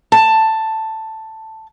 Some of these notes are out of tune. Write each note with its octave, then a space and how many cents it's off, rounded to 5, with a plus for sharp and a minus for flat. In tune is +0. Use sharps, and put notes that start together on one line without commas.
A5 +5